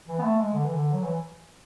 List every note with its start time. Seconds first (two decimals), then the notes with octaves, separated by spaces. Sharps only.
0.08 E3
0.19 B3
0.23 A3
0.39 G#3
0.53 D3
0.63 E3
0.73 D3
0.92 F#3
1.03 E3